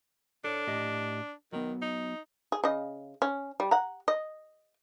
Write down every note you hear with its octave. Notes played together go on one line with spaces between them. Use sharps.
D4 A4 C#5
A2 G4 D#5
D#3 F#3 B3
D#4
G#4
C#3 D#5
C#4
G3
F#5 A#5
D#5